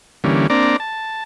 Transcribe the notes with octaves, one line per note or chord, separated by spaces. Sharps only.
D3 E3 G3 A#3 C#4
A#3 C4 D4 D5 A#5
A5